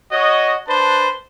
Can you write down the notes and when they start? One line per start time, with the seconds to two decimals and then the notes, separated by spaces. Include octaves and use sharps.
0.12 F#4 C#5 D#5
0.67 D4 B4 C5 A5